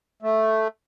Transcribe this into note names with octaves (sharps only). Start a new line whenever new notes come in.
A3